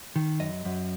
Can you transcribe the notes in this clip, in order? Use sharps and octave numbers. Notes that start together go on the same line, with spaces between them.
D#3
F#2 D#5
F#2